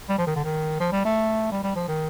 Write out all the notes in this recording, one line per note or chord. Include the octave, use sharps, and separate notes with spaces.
G3
F3
D#3
D3
D#3
F3
G3
A3
G3
G3
F3
D#3